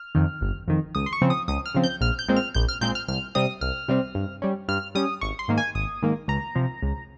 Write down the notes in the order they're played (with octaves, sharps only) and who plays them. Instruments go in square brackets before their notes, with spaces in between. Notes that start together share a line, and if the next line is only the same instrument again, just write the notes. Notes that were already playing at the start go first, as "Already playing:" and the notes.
Already playing: [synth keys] F6
F2 D#3
G1
F2 D#3
C#2 D#6
C6
C#6
C#3 F3 C4
D#6
C#2 D#6
F6
C#3 F3 C4
G6
A#1 F6
G6
A#2 G#3 C4
F6
A#1 G6
F6
A#2 G#3 C4 G6
F6
C2 F6
C3 G3 C4 D#6
C2 F6
C3 G3 C4
G2
G3 C#4
G2 F6
G3 C#4 D#6
G#1 C#6
C6
G#2 D#3 A#3
G#5
G#1 D#6
G#2 D#3 A#3
C#2 A#5
C3 F3
C#2